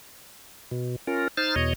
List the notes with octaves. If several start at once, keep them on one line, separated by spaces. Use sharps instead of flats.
B2
C#4 F4 A#4
D#4 C5 F6 A6
E2 B2 C#5 D#5